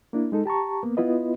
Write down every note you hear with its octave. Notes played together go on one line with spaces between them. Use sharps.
A#3 D4 E4
G#3 D#4 A4
G4 A5 A#5 C#6
A#3 B3
B3 E4 F4 B4 D#5